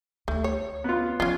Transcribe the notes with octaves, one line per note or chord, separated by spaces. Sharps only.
D2 A3
C#5
B3 F4
F3 C#4 F4